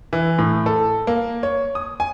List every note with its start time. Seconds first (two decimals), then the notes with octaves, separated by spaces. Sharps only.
0.13 E3
0.38 A2
0.66 A4
1.07 A#3
1.43 C#5
1.75 D#6
2.00 G#5